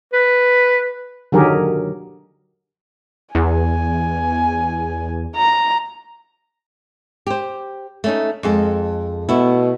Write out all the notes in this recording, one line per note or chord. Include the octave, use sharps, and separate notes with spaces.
B4
D3 D#3 F#3 G4 G#4 A#4
E2 G#5
A#5
G4 C5
A3 C#4 D#4
F2 G#3 A4
B2 A3 B3 E4